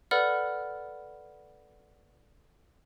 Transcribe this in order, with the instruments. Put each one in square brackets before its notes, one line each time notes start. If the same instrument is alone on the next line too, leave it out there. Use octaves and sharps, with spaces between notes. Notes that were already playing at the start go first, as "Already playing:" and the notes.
[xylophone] A4 B4 D5 F#5 B5 F6